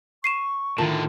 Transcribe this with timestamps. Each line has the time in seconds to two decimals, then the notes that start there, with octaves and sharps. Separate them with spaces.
0.24 C#6 C7 D#7 E7
0.78 A2 D3 D#3 F4 A#4 A5